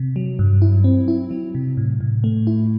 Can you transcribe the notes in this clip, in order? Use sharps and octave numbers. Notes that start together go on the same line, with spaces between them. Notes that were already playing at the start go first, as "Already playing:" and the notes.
Already playing: C3
F#3
G2
E4
C4
E4
F#3
C3
A2
A2
A3
E4